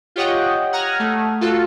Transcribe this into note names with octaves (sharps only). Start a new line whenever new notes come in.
F4 G4 C#5 D#5 F#5 G5
F#5 A#5 D#6 F6 G#6
A3
F4 F#4 A4